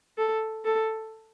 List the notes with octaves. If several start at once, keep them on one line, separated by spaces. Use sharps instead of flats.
A4
A4